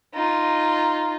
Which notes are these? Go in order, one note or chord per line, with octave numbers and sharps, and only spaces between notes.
D#4 F4